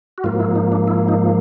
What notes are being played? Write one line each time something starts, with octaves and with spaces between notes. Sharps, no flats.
F#4
G#2 F3 A#3 F4
E4
D#4
D4
E4
D#4